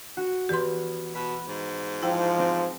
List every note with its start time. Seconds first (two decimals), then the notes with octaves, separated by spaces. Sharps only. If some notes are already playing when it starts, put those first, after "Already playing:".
0.17 F#4
0.49 E2 G4 B4 C6
1.15 B2 B5
1.47 G#2
2.03 F3 E4 G5 A5
2.39 C4